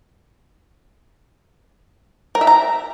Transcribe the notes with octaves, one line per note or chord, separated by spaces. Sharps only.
A#4
E5
A#5